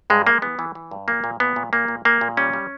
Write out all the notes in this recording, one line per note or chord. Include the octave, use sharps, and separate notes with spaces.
G2 G#3
G#3 A#3
E3 B3
E3
E3
G2
A#2 A#3
A#2
A#2 B3
A#2
A#2 A#3
A#2
A#2 A#3
A#2
G3 C#4
G3